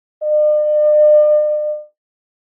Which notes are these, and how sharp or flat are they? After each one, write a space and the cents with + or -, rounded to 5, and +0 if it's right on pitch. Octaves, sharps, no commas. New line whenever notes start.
D5 +45